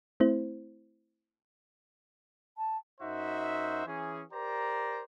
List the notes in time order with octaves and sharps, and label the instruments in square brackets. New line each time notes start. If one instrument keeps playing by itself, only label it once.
[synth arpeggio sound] A3 C4 E4 C5
[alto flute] A5
[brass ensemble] F#2 D#4 F#4 C5 E5
E3 C#4 G#4
G4 A#4 C5 D5 A#5